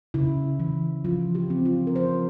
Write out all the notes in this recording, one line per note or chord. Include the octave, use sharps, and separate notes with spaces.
C#3 E4
E3
F3 F4
G4
C4
F4
A#4
F3 C5